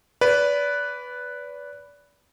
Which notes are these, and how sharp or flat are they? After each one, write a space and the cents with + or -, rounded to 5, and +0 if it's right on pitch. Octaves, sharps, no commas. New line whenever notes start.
B4 +0 D5 -30